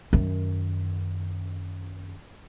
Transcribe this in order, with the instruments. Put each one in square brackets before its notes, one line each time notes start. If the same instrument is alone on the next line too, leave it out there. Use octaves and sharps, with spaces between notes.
[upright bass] F#2 D#3